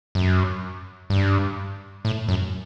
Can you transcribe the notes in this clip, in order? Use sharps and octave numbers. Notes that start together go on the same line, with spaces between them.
F#2
G2
A2
F#2